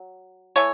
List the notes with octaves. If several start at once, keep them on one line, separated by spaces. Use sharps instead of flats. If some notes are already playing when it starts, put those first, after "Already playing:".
Already playing: F#3
E3 A3 C#5